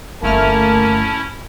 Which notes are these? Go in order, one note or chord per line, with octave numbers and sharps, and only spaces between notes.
G1 A3 A#3 C#4 E4 A5 F6